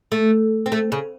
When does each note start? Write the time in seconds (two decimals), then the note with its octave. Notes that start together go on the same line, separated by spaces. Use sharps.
0.12 A3
0.66 C4
0.72 A3
0.92 C#3